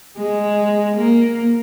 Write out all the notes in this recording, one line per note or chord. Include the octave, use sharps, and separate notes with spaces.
G#3
A#3